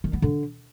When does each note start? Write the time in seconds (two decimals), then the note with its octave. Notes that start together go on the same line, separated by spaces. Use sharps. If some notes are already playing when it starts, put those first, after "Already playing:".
0.04 D#3
0.13 B3
0.22 D3